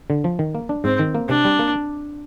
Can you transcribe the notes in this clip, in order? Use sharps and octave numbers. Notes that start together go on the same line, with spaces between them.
D3
F3
D#3
A#3
D4
G#2 C4
D#3
A#3
C3 D4
G3
A#3